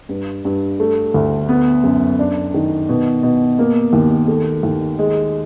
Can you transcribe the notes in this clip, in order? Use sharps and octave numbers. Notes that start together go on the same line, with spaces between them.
G2
G2
A3
D2
B3
F#2
D4
D#3
B2
B2
A#3
D#2
A3
D#2
G#3